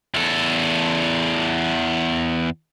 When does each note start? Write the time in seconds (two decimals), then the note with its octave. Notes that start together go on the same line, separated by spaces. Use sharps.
0.14 E2 A4